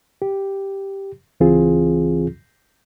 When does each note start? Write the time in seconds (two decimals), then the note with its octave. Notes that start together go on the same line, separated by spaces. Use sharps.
0.22 G4
1.40 C#2 E3 C4 F4 G#4